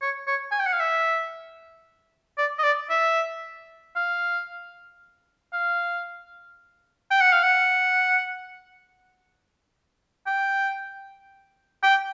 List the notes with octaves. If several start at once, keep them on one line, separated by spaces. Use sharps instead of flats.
C#5
C#5
G#5
G5
F#5
F5
E5
D5
D#5
D5
E5
F5
F5
G5
F#5
F5
F#5
G5
G5